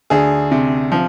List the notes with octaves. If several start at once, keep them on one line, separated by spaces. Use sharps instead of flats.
D2 G#4
C3
F3